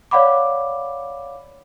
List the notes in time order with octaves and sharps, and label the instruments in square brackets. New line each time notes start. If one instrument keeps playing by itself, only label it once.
[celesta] C#5 D5 F5 F#5 B5 D6